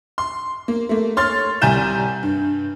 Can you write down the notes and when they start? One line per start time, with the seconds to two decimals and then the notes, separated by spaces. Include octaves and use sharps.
0.18 C6
0.68 A#3
0.89 A3 A#3
1.17 C#5 C6 F6 A6
1.62 C2 G3 G#5 A#5 G6 E7
2.23 G2